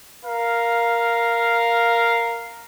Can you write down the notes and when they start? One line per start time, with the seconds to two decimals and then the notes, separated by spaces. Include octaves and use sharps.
0.23 A#4 F5